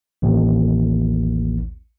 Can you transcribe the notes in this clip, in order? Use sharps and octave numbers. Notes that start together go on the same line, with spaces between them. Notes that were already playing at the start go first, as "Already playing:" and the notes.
A1 D#2